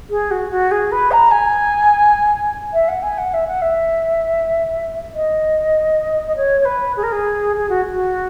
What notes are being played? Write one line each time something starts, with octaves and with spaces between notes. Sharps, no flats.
G#4
F#4
F#4
G#4
B4
A#5
G#5
E5
F#5
G#5
F#5
E5
F#5
E5
D#5
D#5
C#5
C#5
B4
G#4
A#4
G#4
G#4
F#4
F#4